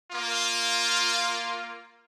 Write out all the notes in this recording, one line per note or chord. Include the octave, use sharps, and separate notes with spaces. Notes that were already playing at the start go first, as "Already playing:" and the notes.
A#3 F4